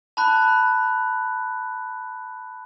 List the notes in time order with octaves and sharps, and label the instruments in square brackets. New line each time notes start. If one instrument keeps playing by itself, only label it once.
[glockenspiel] A5 B5 F#6